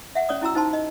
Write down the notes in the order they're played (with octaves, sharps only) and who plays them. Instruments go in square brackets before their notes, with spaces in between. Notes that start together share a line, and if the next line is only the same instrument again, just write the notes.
[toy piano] E5 F#5
C#4 C#5 D5 D#6
C#4 E4 F#4 A#5 E6
D#4 C5 A5 C6
D#5